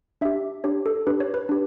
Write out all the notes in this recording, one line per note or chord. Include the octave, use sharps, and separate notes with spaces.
D4 G4 E5
D4 G4 C#5
A4
D4 G4 B4
C#5
B4
D4 G4